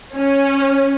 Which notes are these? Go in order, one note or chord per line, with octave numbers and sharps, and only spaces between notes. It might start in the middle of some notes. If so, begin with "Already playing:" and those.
C#4